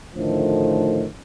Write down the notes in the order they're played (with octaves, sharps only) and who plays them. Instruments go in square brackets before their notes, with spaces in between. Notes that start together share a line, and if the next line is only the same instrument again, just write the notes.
[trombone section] A2 D3 D#3 F3 A3